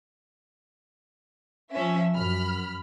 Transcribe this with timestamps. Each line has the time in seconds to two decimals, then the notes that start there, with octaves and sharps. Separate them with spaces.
1.72 F3 C#4 E5
2.14 F#2 B5 F6